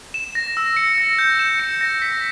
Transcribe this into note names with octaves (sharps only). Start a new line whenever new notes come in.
E7
A#6
E6
C#7
A#6
G6
E7
C#7
A#6
B6